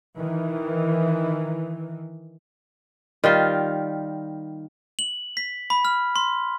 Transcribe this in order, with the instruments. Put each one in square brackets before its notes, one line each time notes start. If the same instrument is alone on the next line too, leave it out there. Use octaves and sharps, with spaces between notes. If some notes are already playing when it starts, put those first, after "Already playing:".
[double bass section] D#3 E3
[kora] D#3 G3 F4
[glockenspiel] F#7
B6
B5
F6
C6